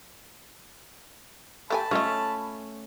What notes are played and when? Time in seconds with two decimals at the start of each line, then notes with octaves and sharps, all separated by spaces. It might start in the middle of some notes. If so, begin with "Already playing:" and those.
1.70 A3 G4 G#5 A5 B5
1.91 A3 C#4 F4 D#5